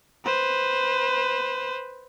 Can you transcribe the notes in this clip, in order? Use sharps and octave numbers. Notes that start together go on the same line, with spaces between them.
B4 C5